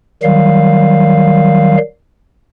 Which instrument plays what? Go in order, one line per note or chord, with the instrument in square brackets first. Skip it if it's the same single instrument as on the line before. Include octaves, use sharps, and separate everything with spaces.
[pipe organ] D#3 F#3 G3 F5